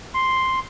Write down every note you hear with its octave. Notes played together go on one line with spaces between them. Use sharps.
C6